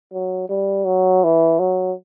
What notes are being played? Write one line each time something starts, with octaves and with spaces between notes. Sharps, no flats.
F#3
G3
F#3
E3
F#3